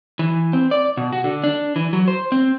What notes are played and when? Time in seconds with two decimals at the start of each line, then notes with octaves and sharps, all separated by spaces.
0.19 E3
0.53 C4
0.71 D5
0.97 B2
1.13 F#4
1.24 D3
1.44 D4
1.76 E3
1.93 F#3
2.08 C5
2.32 C4